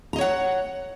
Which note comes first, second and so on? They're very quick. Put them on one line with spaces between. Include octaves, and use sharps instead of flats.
A#5 D#5 C#5 F#5